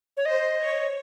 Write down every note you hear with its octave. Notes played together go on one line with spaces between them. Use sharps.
C#5
C5 D#5
C#5